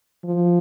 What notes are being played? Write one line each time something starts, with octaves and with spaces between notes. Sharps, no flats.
F3